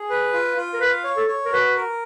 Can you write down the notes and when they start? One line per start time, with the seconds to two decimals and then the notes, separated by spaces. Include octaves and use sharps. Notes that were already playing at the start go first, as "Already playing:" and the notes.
Already playing: G#4
0.10 B4
0.33 F4
0.56 F4
0.74 A#4
0.80 B4 F5
1.04 C#5
1.17 A4
1.28 C#5
1.46 A#4
1.52 F#4 B4
1.76 A#4